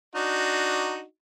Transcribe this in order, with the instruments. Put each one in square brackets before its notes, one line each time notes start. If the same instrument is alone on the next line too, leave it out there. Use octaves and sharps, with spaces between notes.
[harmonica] D4 D#4 F#4